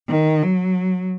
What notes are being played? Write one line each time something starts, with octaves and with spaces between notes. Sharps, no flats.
D#3
F#3